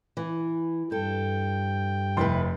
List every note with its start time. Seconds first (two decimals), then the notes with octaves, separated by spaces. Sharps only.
0.17 E3
0.92 G2 A4 G5
2.17 F1 C3 E4 B4 C6